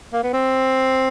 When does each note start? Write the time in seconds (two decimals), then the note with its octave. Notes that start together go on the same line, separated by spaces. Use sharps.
0.13 A#3
0.24 B3
0.33 C4